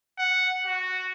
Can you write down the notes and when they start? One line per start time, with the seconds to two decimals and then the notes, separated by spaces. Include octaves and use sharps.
0.18 F#5
0.66 F#4